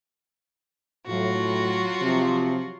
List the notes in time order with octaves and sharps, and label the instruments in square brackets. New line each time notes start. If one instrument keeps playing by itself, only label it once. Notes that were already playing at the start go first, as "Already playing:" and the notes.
[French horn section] A2 [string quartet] F#3 F4 F#4
[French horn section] C3 F3